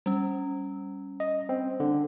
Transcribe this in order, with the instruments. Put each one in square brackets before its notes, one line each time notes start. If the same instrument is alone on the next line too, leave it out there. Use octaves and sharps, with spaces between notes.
[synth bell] G3 C#4
[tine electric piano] D#5
C4
D3